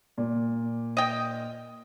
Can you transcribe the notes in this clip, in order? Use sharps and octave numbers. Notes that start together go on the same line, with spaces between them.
A#2 D5
D#5 G5